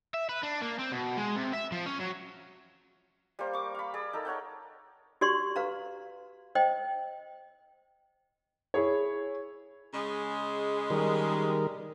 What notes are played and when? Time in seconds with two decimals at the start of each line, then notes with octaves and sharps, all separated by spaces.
0.14 E5
0.29 B4
0.43 D4
0.62 A#3
0.79 C4
0.92 B2
1.17 G#3
1.36 C3
1.53 E5
1.72 F3
1.86 C#4
1.99 F#3
3.39 G3 A#3 C5
3.53 C#6 D6
3.74 F5 B5
3.94 G#4 D5
4.13 D#4 A4 A#4
4.25 A#4 C#5 F#5 G5
5.21 F#4 G4 D5 C6 C#6
5.56 B4 F5 A#5
6.55 C5 D#5 G5
8.74 E4 G#4 C#5
9.93 C#3 G#3
10.90 D#3 G3 A#4